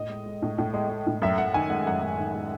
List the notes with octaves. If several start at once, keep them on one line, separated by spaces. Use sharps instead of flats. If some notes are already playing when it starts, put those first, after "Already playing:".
Already playing: A2 D#5
G#3
G#3
A2
A2
G#3
G#3
A2
F#2 E5
F#2 F#5
D#3 G#5
G#3 F#5
F#2 F#5
F#2
D#3
G#3